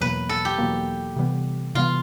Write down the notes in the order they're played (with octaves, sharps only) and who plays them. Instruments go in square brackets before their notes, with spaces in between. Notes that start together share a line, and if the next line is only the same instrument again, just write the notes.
[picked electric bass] E2 B2 F#3 A#3 [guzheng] B4
[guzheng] A4
G4
[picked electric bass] E2 B2 F#3 A#3
C3 E3 G3 B3
[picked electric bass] C3 E3 G3 B3 [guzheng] F4